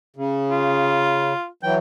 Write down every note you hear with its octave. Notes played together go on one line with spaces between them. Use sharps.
C#3
F4
E3 F#3 G5